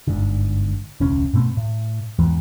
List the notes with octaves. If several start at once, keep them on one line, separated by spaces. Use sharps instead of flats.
G1 G#2 D3
E1 C#2 C#4
G#2 B2 A3 C4
A2
E2 G#2 E3